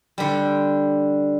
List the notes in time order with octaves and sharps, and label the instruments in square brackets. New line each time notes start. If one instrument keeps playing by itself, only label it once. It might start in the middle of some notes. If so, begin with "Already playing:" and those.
[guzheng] D3 G3